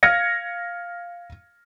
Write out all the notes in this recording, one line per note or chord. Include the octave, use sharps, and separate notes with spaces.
F5 F6 G#6 A#6 C#7